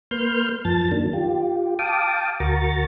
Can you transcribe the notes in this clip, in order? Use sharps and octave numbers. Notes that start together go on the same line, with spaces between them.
A#3 B4 C6 F6 G6
F#2 F3 A5 A6
D#3 F#3 A#3 D4
F4 G4
F5 G5 A5 D6 D#6
D2 F#4 A#4 A#5 C#6 A6